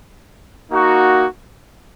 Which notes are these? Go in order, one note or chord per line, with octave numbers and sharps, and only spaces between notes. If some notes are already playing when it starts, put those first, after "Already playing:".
A#3 D#4 F#4